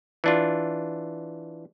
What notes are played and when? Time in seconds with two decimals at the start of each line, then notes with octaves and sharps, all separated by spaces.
0.24 E3 D4 F4